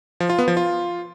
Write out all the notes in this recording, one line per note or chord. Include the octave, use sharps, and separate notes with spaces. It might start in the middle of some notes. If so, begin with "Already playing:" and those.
F3
F4
B3
F3
F4